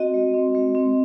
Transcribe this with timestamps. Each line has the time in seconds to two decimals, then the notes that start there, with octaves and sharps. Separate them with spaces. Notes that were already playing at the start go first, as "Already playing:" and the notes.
Already playing: C4 F#4 D#5
0.14 G#3
0.34 C4
0.55 G#3
0.75 C4